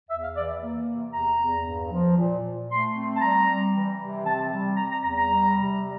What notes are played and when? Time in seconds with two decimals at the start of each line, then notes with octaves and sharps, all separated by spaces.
0.10 E2 E5
0.23 F5
0.35 E3 D5
0.48 E5
0.61 A#3
0.87 C3
1.13 E2 A#5
1.40 E2
1.66 G2
1.92 F3
2.17 A#2
2.43 A#2
2.69 A3 C6
2.95 C4
3.16 A5
3.21 G3 A#5
3.47 G3
3.74 E3
3.99 C3
4.25 C4 A5
4.52 G3
4.77 G3 A#5
4.91 A#5
5.03 E2 A#5
5.17 A#5
5.30 G3
5.56 C3
5.82 G3